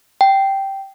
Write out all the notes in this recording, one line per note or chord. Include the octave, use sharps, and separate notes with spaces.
G5